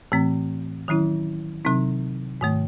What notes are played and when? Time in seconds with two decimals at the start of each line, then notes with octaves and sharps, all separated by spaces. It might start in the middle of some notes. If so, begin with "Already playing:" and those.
0.12 A2 E3 A3 C4
0.88 D#3 F#3 C#4 E4
1.65 C3 F#3 C4 D#4
2.41 G#2 D#3 A3